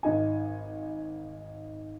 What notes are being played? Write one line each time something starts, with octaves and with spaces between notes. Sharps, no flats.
G#1 D#4 G#5